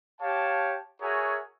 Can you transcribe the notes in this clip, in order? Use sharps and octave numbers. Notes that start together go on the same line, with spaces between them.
G4 C#5 F5 A5
F#4 G#4 A#4 C#5 E5 G#5